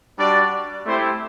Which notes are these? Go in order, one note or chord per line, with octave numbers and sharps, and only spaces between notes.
G3 D4 F#4 D5
A3 C4 E4 G4 C5